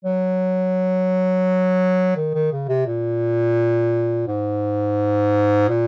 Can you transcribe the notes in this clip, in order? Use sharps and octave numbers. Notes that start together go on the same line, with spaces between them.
F#3
D#3
D#3
C#3
C3
A#2
G#2
A#2